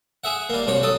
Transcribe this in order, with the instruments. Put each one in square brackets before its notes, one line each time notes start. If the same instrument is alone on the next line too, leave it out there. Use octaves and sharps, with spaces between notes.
[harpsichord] G#4 E5 F#5
G3 A#3
C2 F#4 C#5
F#3 A4 D#6